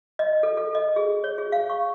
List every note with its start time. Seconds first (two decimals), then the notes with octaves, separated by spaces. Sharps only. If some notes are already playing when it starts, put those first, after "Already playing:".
0.19 D#5
0.43 A4
0.57 A4
0.75 D#5
0.96 G#4
1.24 C#5
1.38 G#4
1.52 F5
1.70 C#6